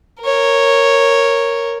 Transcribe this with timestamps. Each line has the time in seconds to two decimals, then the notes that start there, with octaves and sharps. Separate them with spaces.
0.21 A#4 C#5